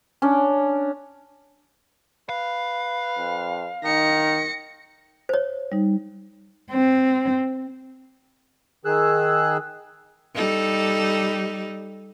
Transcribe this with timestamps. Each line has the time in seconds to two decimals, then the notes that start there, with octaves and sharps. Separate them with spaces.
0.22 C#4 D4
2.29 B4 F5
3.18 F2
3.84 D#3 D#4 A#6 C#7
5.29 C5 C#5
5.72 G3 D#4
6.71 C4
8.85 D#3 G#4 E6 F#6
10.35 G3 D#4 A4